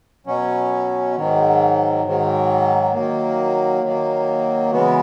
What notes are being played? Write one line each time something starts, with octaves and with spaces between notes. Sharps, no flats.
B2 F#3 C#4
G#2 D#3 F#3
G#2 D#3 F#3
D#3 F#3 A#3
D#3 F#3 A#3
C#3 E3 G#3 B3 F#4